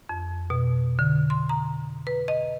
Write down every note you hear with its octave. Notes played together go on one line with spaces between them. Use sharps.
F2
B2
D3
C6
A#5
B4
D#5